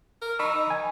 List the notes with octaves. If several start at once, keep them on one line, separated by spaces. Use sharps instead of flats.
A#4
D#4 B5 C#6 E6
G#5